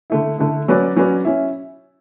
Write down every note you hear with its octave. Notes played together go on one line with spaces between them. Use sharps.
D3 A3 E4
D3 A3 E4
F#3 C#4 F#4 B4 D5
F#3 C#4 F#4 B4 D5
C#4 E4